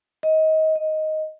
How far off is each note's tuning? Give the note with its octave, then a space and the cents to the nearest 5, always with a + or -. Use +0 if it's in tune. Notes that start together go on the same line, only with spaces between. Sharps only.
D#5 +25
D#5 +5